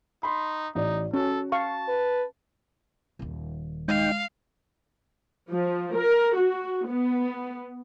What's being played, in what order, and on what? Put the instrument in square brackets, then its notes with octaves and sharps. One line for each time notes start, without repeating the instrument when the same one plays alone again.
[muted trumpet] D#4 [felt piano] B5 C6
[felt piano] A1 D5 [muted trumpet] D#4
[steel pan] C#4 [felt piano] F#4 [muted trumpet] A4
[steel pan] F5 C#6 [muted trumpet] A5
[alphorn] B4
[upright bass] D#1 D#3
[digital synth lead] G#3 [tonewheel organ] D#4 G5 [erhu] F5
[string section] F3
A#4
F#4
B3